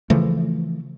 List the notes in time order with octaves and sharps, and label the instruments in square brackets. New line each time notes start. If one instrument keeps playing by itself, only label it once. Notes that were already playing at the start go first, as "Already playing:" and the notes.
[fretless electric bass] C#3 E3 F3 A3